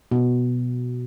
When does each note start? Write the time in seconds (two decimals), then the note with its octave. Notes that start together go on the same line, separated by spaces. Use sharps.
0.12 B2